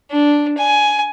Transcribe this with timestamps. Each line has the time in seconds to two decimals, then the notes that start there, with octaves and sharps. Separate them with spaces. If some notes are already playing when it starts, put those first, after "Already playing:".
0.11 D4
0.57 G#5